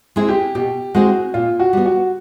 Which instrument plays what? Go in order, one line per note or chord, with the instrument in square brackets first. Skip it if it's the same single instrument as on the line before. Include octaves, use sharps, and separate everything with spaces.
[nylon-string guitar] G#3 C4 E4 G#4
[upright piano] G4
[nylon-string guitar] B2 [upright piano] G4
[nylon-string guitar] G#3 C4 E4 G#4 [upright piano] F#4
[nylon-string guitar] A#2 [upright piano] F4
[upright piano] F#4
[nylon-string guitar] G3 B3
[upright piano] F#4